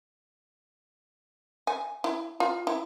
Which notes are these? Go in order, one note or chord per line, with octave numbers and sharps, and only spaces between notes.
G#5
E4
F4
E4